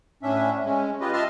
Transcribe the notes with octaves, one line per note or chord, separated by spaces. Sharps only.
A2 C#4 D4 E5
G#3 C#4
F4 G4 B4 D#5
D#5 E5 A5 C6 F6